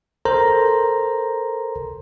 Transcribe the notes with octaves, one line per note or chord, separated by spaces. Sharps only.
A4 A#4 C5 A#5